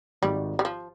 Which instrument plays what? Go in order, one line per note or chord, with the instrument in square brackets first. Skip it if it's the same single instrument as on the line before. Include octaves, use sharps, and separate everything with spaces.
[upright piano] G#1 G#2 D#3 [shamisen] G3
[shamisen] G3
F3